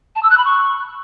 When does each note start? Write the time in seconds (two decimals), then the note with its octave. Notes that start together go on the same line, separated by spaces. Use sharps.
0.16 A5
0.23 E6
0.30 F#6
0.38 B5
0.45 C#6